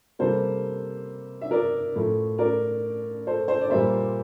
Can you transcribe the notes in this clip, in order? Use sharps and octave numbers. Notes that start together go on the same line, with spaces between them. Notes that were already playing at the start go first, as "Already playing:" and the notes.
C3 G3 A#3 A4 C5
E5
A#4 D5
A2 F3 A3
A#4 D5
A4 C5
A4 C5
D5
A#2 G3 A#3 C5 E5